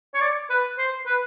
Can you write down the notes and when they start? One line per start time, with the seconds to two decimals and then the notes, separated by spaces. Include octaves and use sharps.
0.14 C#5
0.20 D5
0.50 B4
0.78 C5
1.06 B4